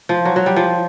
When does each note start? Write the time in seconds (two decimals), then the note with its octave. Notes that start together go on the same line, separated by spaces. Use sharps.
0.09 F3
0.25 F#3
0.36 F#3
0.46 G3
0.56 F3